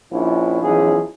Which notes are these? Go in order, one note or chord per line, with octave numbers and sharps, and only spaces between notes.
A#1 F3 C#4 D4 E4
B1 E3 F3 C#4 D#4 G#4